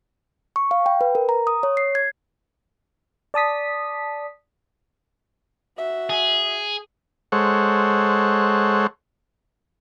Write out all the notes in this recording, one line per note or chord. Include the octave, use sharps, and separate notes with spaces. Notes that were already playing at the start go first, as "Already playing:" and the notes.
C#6
F5
G5
B4
A#4
A#5
D#6
C#5
C7
G#6
D5 A5 D#6 B6
F#4 E5
G#4
G#3 A4 C5 C#5 F#5